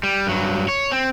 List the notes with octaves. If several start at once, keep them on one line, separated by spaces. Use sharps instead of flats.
G3
G2 F#3
C#5
C4